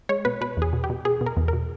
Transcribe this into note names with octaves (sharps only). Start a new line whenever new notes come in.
G#3 C#5
B2 B4
B2 B4
E2 G#4
B2
G4
B2
B2 G#4
B2
A#4
E2
B2 A#4